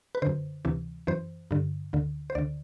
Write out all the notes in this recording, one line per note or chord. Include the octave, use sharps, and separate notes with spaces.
B4
F#2 D3 C5
D2 C3 E3
F#2 E3 C5
G2 D3
D2 D3
C5
D2 D3 D5